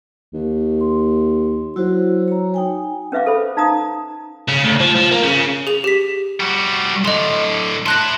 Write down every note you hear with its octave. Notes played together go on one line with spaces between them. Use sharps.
D#2
C6
F#3 E4 F#4 C5
C#5 A#5
D#4 G5 G#5
C#4 B4 E5 F5 D6
A4 C5 B5
D#4 F5 A#5 D#6
C#3
D2
F3
F3
A#3
C#3
G#4 F7
G4 B6
G3 F#4
A2 D3 D#5 C6
E4 A5 C6 F#6 A#6